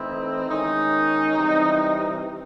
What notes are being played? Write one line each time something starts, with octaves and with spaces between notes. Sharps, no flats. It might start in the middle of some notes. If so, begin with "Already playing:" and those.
Already playing: E3 A3 C4 D#4 E4
D#3 G#3 C#4 D#4
C3 E3 G3 C4